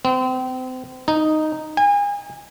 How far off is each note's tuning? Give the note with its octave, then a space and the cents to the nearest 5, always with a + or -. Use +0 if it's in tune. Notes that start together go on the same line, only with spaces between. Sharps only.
C4 -30
D#4 -5
G#5 -35